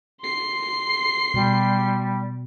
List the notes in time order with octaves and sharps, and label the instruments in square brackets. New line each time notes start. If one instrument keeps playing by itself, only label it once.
[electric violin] C6 C7
[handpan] B2 [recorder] G3